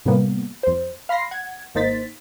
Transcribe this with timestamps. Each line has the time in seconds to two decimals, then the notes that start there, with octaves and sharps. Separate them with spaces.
0.05 A2 C3 G3 A#3 B3
0.63 F2 C5
1.09 F5 B5 C6 A#6 C7
1.31 F#5 G#6
1.75 G#1 A#3 D#4 C5 A6 B6